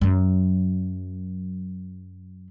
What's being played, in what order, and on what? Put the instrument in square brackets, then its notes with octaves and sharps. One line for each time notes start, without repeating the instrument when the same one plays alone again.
[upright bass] F#2 F#3